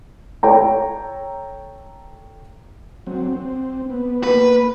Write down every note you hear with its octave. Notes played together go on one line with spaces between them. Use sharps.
A4 C#5 G5 A#5
F#3 C4
C4
B3
A#3 B4